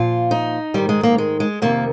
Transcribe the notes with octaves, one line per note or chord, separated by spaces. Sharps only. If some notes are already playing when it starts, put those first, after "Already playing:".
Already playing: A#2 F3 F4
D#4
G#2 D#3 G3
G#3
A#3
G#3
G#3
F2 C3 D#3 A#3